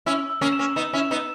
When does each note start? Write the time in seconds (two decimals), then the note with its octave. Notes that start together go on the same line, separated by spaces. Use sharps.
0.06 C#4 E4 E6
0.30 E6
0.41 A#3 C#4
0.52 E7
0.59 A#3 C#4
0.76 B3 D#4 E7
0.93 C#4 E4
0.99 E7
1.11 B3 D#4